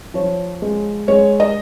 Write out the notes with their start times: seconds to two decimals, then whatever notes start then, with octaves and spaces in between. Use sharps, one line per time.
0.14 F3 C#5
0.62 G#3
1.08 G#3 C#5
1.40 D#5